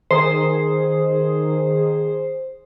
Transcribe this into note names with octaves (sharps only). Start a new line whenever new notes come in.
D#3 G#4 C5